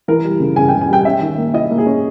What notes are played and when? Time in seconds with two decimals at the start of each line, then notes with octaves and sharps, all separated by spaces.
0.08 E3 A#4
0.24 G3
0.40 C#3
0.56 C#3 G#5
0.69 G5
0.73 C#3
0.81 G#5
0.89 G3 G5
1.05 C#4 E5
1.21 D#3
1.38 A#3
1.54 E4 D#5
1.71 A#3
1.78 G#4
1.86 C#4